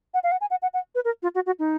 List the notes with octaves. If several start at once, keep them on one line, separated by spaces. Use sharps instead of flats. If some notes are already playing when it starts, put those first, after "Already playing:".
F#5
F5
F#5
G#5
F#5
F#5
F#5
B4
A#4
F4
F#4
F#4
D#4